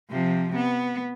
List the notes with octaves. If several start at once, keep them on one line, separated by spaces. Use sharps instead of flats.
C3 F3
B3